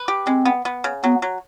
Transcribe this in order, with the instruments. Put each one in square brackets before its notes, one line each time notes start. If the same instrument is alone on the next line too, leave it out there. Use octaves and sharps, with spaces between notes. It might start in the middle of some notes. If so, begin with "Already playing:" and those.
Already playing: [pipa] B4
G4
[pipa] G#3 [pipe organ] C4
[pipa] B3
B3
C#3
[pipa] F#3 [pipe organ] B3
[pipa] F#3